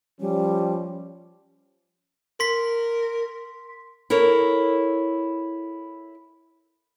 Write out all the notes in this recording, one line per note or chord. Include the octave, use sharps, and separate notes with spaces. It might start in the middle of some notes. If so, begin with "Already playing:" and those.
F3 G3 C#4
A#4 C6 B6
E4 A4 A#4 C#5